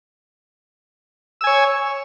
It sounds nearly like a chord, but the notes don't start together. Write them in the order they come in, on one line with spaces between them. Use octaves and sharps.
E6 G#5 C#5